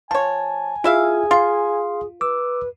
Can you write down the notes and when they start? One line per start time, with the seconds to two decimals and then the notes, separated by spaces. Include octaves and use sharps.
0.11 F3 C#5 G#5 A5
0.84 E4 F4 G#4 E5 F5
1.31 F4 F5 C6
2.21 B4 D6 E6